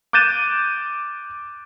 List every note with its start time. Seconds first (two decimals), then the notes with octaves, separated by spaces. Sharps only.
0.13 D6 F#6 G6 A6 D#7 E7